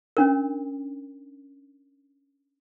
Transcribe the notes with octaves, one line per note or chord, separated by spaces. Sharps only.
C#4 D4 A#4